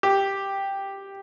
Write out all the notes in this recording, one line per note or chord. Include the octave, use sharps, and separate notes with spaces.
G4